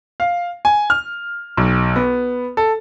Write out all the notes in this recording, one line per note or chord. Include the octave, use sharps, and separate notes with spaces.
F5
G#5
F6
B1
B3
A4